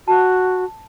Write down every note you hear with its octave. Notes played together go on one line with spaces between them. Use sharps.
F#4 A5